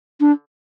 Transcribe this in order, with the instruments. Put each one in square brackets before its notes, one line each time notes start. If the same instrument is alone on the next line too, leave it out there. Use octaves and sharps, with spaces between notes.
[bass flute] D4